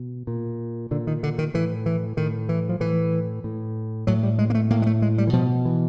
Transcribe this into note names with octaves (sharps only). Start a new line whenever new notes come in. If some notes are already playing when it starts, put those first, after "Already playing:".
Already playing: B2
A#2
A#2 D3
D#3
D3
D#3
A2 E3
E3
A2 D#3
E3
F3
A2 E3
A2
A2 F#3
G3
G#3
A#3
A3
A2 A#3
G#3
A3
G#3
G3
E3
B2 F3
E3